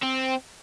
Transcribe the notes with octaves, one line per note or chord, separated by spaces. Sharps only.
C4